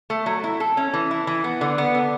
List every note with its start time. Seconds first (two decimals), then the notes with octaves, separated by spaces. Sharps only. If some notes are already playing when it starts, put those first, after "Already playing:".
0.10 A3
0.26 F#3
0.44 E4
0.60 A4
0.77 C#4
0.94 E3
1.11 E4
1.27 E3
1.44 B3
1.61 D3
1.78 B3
1.95 D3